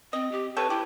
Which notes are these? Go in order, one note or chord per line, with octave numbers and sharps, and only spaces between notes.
C4 D#5
G4
C3 A4 B4 C#5
E4 G4